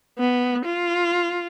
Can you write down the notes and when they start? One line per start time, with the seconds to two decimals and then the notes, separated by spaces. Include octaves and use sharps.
0.18 B3
0.65 F4